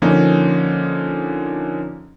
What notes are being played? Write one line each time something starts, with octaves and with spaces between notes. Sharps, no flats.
D3 F3 A#3 C#4 D#4